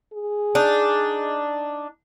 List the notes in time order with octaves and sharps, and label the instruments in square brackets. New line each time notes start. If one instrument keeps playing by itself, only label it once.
[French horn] G#4
[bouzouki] D4 D#4